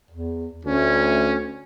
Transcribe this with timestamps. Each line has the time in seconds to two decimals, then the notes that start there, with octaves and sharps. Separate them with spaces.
0.11 E2
0.65 D2 A3 C#4